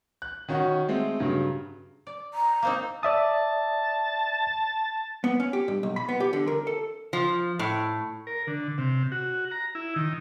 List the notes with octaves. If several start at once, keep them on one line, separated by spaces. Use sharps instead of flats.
F#6
D#3 C#4 F#4
G#3 A3 C4
G2 C#3 F#3
D5
A#5
A#3 C4 D#4
D5 E5 A5 D#6
B3
C#4
G4
G2
B1
B5
B3
G4
D3
A#4
A4
F3
A2
A#4
D3
C3
F#4
A#5
E4
D#3